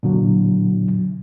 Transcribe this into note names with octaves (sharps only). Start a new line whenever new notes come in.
A#2 D3 F#3